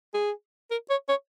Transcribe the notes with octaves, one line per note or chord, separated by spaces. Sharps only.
G#4
A#4
C#5
C#5